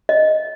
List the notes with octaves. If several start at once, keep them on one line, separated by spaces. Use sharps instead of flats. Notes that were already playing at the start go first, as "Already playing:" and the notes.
D#5